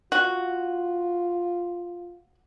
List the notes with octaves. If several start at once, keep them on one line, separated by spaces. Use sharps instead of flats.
F4 F#4